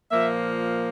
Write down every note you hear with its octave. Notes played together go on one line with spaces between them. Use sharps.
A#2 F3 A#3 E5